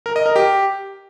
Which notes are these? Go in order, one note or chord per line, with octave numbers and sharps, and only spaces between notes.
A#4
D#5
A#4
G4